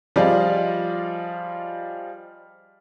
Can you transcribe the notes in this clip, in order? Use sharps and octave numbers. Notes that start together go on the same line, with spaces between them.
F3 G3 F4 G#4 D5 D#5